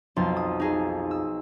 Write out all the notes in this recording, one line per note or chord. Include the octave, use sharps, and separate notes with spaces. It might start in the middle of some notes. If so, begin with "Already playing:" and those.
B1 F2 C6 A6
D#6
D#4 G#4 A4
E6